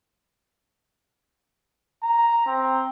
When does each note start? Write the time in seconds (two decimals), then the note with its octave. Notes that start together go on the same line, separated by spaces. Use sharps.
2.03 A#5
2.46 C4